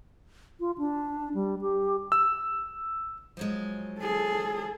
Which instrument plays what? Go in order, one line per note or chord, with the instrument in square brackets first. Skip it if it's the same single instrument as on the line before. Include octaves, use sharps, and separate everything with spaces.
[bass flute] F4
D4
G3
G4
[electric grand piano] E6
[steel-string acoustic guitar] F3 F#3 G#3
[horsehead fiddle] G#4 A4